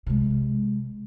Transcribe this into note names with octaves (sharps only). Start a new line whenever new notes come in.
C3 G#3